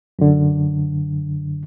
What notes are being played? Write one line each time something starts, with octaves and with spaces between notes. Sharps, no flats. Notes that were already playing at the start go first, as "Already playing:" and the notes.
F#2 D3